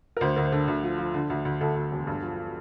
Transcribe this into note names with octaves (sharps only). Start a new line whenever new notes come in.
A#4
D2 C5
D2 A#4
C5
D3
D2
F3
F3
D3
D2
D2
D2 A4
D2
E1
G2
F3